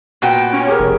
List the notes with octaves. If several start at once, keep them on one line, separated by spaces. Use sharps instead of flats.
A#2 B3 F#4 F5 G5
C#4
G4 G#4 A#4
F1